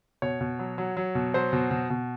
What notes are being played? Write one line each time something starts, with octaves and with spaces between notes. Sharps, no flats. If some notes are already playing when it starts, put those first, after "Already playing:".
B2 C#5
B2
F#3
F#3
F#3
B2
F#3 C5
B2
B2
B2